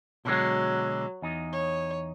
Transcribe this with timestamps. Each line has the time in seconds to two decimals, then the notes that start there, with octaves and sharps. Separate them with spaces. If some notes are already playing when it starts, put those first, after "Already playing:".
0.25 B2 D3 F#3 G#3
1.22 E2 D#4
1.53 C#5